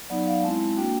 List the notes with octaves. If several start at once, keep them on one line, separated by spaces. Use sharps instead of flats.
F#3 B3 D#4 D5
F5
G#3 C4 E4 A5
A#3 D4 F#4 G5